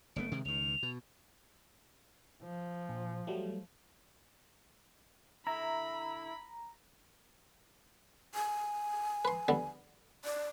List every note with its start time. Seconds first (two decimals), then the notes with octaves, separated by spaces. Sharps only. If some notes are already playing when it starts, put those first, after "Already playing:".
0.16 F#1 A3 B3 D7
0.32 C3 D#3 G#3
0.45 C#2 D#3 F7
0.83 B2
2.43 F3
2.89 A#1
3.27 F#3 G3 A3
5.47 D3 E4 E5 A#5 B5
8.35 G#5
9.25 B4 C6
9.48 D3 G3 B3
10.24 D5